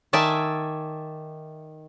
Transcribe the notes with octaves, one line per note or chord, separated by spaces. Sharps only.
D#3 D5 E5 G#5 A5